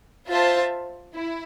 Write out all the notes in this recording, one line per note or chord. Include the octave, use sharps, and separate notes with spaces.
F4 C5 E5 A5
E4